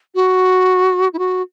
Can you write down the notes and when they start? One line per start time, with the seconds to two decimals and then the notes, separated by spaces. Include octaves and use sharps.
0.15 F#4
1.13 E4
1.19 F#4